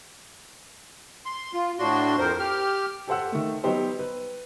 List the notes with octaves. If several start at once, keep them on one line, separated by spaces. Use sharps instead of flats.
C6
F4
A2 D4 F#4 C6
F2 A#4 C5
G4 F6
G4 A4 C5 F#5 E6
D#3 A3
F#3 G3 B3 D#4 G4 C5
B4